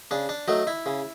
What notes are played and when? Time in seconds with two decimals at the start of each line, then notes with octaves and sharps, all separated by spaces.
0.11 C#3 D4
0.29 D4
0.48 F#3 A3 D#4
0.67 E4
0.86 C#3